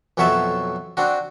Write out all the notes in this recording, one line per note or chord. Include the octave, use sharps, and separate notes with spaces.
B1 F2 F#3 C#5 E5 A5
C4 D4 F#4